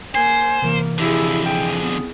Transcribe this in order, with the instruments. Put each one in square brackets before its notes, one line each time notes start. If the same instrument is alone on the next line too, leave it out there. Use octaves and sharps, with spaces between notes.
[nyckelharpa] A#3 [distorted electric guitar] C5 [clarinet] G#5
[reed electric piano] C3 E3 [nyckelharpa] A#3
[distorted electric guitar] F2 D3 [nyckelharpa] E4 G#4 [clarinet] G4
[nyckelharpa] G#4 [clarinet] G5
[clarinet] B3